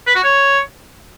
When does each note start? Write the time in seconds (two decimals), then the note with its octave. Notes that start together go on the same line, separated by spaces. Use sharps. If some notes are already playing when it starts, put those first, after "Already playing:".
0.07 B4
0.15 F#4
0.24 C#5